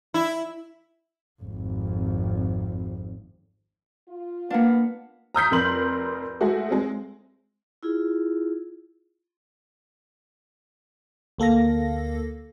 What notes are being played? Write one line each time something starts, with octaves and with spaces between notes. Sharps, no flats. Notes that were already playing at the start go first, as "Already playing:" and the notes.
E4
G#1 F2
F4
A#3 B3 D4 F5
A#5 D#6 G6 B6
F1 F2 A#4 C6 F#7
G#3 A3 F#4
G#3 C4
E4 F4 G#4
D2 A#3 A4 F5 A#6